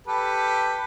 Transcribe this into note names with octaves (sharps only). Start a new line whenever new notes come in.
G4 A4 B4